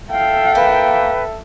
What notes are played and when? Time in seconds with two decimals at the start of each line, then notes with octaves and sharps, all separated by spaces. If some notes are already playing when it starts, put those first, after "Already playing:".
0.11 A4 E5 F5 G5
0.55 A#3 B4